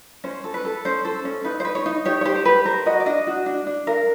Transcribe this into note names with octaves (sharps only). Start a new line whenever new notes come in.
C#4 C5
A4
B4
A4
C#4 C5
A4 C5
C#4
D#4 B4
C5
B4
C#5
D#4
G4 C#5
C#5
G4 C5
C5
G4 B4
A#4 C5
F#4 D#5
D5
D4 D#5
F#4
D4
D4
A#4 F5